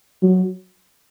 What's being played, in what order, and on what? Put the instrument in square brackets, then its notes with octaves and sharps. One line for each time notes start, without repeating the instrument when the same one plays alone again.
[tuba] F#3